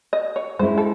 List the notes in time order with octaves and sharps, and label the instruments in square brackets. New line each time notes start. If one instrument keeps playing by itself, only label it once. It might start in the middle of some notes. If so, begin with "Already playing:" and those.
[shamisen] D#5
C#5
[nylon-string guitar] G#3 C#4 E4 G#4 [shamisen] C5
[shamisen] A4